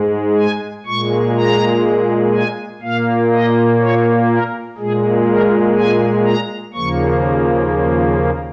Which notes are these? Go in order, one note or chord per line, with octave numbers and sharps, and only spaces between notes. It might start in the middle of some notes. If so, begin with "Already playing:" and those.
Already playing: G#2 G#3
G#5
A#2 G#3 C#6
A#5
G#5
A#2 A#3 F5
D#5
C#5
A#4
A#2 G#3 G#4
A#4
G#5
A#5
D#2 C#3 F3 A#3 C#6